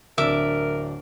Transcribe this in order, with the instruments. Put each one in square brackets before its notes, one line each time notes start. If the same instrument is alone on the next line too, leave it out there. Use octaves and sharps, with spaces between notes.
[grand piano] D1 D4 [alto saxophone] A#4 [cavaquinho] E5 D6